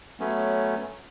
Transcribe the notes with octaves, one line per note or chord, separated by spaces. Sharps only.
F#3 A3 B3 C#4